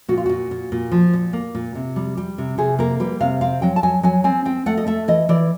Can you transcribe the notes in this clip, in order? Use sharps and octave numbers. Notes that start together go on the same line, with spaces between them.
A#2 F#4
F4
A#2 F#4
A#2
A#2
F3
A#2
A#3
A#2
C3
G3
G3
C3
C3 G#4
A#3 A#4
G3 B4
C3 F5
C4 F5
F#3 G5
A5
F#3 G#5
F#3 G#5
C4 G#5
C4 G5
A3 F#5
D#5
A3 E5
E3 D#5
E3 D5